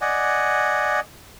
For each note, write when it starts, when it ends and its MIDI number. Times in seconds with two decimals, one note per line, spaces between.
0.01 1.00 74
0.01 1.00 75
0.01 1.00 78
0.01 1.00 80